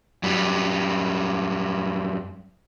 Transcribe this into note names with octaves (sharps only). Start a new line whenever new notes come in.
F#2 G3